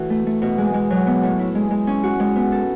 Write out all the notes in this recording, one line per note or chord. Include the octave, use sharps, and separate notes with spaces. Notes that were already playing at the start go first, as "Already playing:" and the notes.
Already playing: A2 E3 F#4
A3
A3
B2
G#3
G#3
F#3
B3
A2
E4
G#3
G#3
C#4
F#4
G#3
B3
A4